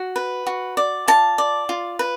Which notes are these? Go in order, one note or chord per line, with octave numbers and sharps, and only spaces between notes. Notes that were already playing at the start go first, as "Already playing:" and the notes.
Already playing: F#4
B4
F#4
D5
F4 A5
D5
F4
B4